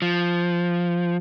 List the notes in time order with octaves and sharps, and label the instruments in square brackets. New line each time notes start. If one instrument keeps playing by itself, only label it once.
[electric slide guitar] F3